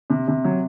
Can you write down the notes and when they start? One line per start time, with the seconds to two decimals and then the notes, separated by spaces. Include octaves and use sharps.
0.10 C3
0.28 C3
0.44 F#3